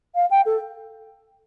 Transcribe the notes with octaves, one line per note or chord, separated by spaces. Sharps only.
F5
G5
A4